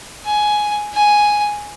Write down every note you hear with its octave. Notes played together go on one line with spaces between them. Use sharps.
G#5
G#5